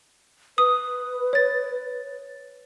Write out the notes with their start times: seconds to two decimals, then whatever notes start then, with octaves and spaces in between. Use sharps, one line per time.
0.58 B4 D#6
1.33 C#5 A6